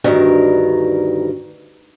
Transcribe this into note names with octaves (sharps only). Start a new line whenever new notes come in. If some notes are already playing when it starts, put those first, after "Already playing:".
D2 G2 D#3 A#4